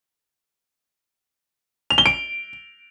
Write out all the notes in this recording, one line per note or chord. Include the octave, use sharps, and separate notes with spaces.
F7
G7
D7